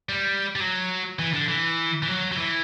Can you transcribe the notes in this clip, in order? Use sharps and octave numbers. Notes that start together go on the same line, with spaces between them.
G3
G3
F#3
E3
D3
E3
E3
F#3
F#3
E3